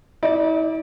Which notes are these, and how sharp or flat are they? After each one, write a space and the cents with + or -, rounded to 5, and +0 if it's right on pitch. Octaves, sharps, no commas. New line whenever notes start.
E4 -45 D5 +0